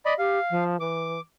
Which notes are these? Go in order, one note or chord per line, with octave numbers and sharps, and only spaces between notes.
D5 D#5 B5
G4 F5
F3
E3 D6